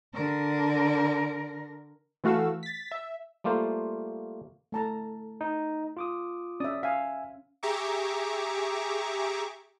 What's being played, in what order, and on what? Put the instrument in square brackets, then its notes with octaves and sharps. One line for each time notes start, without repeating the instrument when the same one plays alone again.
[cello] D3 A#4
[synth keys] E3 A3 F#4 F5 E6
A6 B6
E5
[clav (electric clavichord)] G3 A3 A#3 F4 C5
[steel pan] A3 A5 A#5
[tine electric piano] D#4
F4 D6 D#6
[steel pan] C#4 E5 [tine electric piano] D5 D#6
[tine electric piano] E5 G#5 [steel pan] F5
[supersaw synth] G4 G#4 E5 A#5 C#6 D6